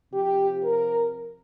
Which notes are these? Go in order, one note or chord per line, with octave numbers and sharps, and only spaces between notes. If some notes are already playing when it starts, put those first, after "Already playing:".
C3 F3 G4
A#4